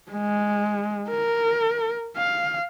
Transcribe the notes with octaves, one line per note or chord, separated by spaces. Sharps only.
G#3
A#4
F5